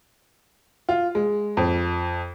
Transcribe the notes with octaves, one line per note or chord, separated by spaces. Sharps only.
F4
G#3
F2